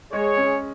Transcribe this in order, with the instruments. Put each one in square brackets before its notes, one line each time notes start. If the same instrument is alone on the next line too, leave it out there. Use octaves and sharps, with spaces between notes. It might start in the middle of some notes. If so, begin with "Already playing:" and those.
[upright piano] G#3 [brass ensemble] G#4 C#5
[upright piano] C#4